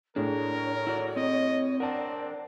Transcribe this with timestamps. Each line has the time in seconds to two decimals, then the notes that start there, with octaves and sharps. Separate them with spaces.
0.16 A2 D4 G#4 A#4 C#5
0.87 E4 F#4 D5
1.16 C4 D#5
1.80 C4 D4 A#4 D5 F#5 A5